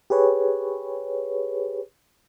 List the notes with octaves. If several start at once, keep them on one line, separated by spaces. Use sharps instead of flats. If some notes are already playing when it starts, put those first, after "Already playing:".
G4 G#4 B4 C#5